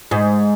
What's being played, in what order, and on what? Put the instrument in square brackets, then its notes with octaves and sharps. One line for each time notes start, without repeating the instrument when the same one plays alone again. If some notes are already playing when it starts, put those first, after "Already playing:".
[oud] G#2